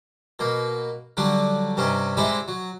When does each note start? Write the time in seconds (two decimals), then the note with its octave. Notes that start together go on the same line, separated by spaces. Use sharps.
0.39 B2 A#3
1.17 D3 F#3 G3 D4
1.77 G2 C3 C#4 D#4
2.17 G3 G#3 C4 D#4 E4
2.48 F#3